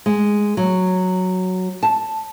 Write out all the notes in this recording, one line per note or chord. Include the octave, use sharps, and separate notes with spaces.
G#3
F#3
A5